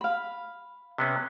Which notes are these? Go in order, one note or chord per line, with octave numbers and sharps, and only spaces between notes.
F5 B5
C3 B3 C#4